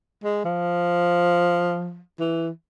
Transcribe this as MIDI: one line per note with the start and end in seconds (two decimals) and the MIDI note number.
0.24 0.42 56
0.44 1.99 53
2.19 2.49 52